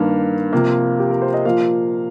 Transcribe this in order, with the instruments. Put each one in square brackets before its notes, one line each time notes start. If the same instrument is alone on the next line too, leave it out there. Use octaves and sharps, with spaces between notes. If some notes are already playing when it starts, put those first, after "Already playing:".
Already playing: [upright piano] G2 D#3 A#3
C3 F3 A#3
G4
A#4
C5
D#5
A#2 F3 A#3 F5